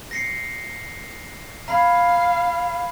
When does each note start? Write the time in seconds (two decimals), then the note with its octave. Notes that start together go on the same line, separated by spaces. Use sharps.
0.11 A#6 C7 C#7
1.68 F5 A#5 B5 G#6